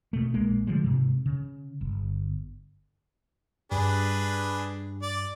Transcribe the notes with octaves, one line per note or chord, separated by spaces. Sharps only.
B2 A3
A#1 G#3 A#3
D3 F3 G3 G#3
G#2 C3
C#3
G1
G2 D4 G#4 B4
D5